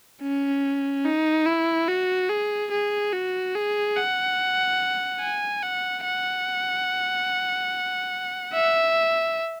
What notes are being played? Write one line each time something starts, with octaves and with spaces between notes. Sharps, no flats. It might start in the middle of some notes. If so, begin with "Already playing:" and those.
C#4
D#4
E4
F#4
G#4
G#4
F#4
G#4
F#5
G#5
F#5
F#5
E5